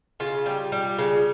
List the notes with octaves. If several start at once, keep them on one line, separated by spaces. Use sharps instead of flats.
C#3 F4
G3
G3
C#3